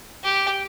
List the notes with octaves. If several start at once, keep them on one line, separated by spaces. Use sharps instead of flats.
G4